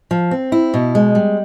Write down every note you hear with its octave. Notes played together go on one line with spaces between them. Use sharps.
F3
C4
E4
B2
G#3
G3